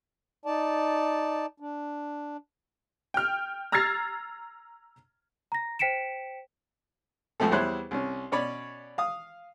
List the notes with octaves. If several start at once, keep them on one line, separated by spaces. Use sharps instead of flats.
D#4 D5 A5
D4
G5 F6
A#5 E6 F6 G#6 A6 C7
A#5 A#6
C5 G5 B6 C#7 D7 E7
B1 F3 A3 C4 A4
E2 G3 E4 C5 C#5 F#6
C2 C#4
B2 C#4 C#5 D5 B5
F5 D#6